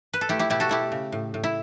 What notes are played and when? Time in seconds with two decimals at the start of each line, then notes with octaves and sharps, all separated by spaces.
0.13 B4
0.21 A4
0.29 A3 E4 G4
0.39 E4 G4
0.50 B2 E4 G4
0.60 F#4 A4
0.69 A3 E4 G4
0.92 C#3
1.12 A2
1.34 A2
1.44 E4